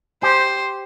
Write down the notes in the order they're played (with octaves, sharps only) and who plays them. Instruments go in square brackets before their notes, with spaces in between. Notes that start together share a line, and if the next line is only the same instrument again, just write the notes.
[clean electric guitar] G4 [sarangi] C5